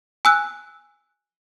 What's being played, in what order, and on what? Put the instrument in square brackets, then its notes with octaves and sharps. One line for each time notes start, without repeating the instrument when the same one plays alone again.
[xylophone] G#5 E6 F#6